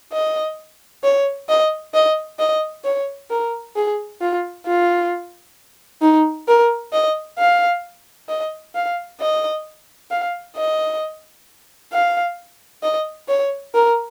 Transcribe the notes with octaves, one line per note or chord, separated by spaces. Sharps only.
D#5
C#5
D#5
D#5
D#5
C#5
A#4
G#4
F4
F4
D#4
A#4
D#5
F5
D#5
F5
D#5
F5
D#5
F5
D#5
C#5
A#4